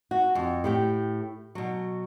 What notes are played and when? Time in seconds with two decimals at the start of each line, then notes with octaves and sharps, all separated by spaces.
0.11 F#4
0.35 F2
0.64 A2 G4 G5
1.55 B2 F#3